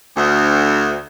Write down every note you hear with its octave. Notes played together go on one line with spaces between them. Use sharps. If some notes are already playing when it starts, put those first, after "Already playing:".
D2